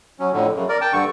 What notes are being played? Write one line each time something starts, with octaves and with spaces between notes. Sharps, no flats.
F#3 C#4
F2 A2 D3
F#2 C#3
A#4 D5
G5 A5
G2 D3 C#6